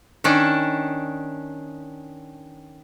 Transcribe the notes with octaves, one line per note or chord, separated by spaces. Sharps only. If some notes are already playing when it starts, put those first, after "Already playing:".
D#3 C#4 D4